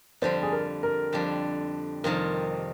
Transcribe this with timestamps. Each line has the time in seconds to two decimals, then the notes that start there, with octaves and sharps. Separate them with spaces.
0.22 F2 D3 G3 D4 C5
0.43 G#4
0.52 A#4
0.83 A#4
1.13 F2 D3 G3 D4
2.04 F2 C3 D#3 G3 A#4